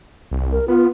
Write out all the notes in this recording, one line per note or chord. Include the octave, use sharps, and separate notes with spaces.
C2
A#4
B3 F4